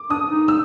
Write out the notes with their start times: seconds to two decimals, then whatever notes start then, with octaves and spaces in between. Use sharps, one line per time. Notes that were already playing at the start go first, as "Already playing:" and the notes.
Already playing: D6
0.10 D4 D#6
0.29 D#4
0.48 E6